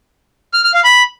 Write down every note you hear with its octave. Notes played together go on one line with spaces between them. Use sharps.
F6
F6
F5
B5